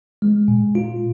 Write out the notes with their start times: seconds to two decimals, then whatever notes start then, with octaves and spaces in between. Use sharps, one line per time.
0.22 G#3
0.48 A#2
0.75 F4